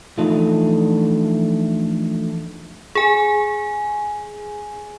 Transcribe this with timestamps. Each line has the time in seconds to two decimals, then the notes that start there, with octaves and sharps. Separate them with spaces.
0.18 E3 F3 A3 D4 D#4 F4
2.95 G#4 G#5